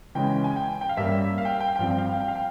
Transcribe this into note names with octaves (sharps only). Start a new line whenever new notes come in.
C#3 E3 G#3 C#4 G5
G#5
G5
G5
F5
G2 G3 A#3 C#4 E5
F5
G5
F5
G5
F5
G5
G2 F3 C4 F5
G5
F5
G5
F5
G5
F5
G5